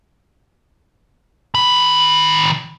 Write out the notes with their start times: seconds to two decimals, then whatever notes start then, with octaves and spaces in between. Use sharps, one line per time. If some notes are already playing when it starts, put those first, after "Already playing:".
1.55 D#3 B5